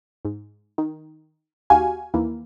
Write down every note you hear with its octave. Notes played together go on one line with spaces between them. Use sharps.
G#2
D#3
D#2 F#4 G4 F5 G#5
D#2 D#3 E3 A#3